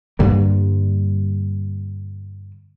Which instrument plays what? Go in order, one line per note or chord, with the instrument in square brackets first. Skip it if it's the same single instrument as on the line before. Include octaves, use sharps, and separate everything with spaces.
[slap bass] G2 D3 G3 A#3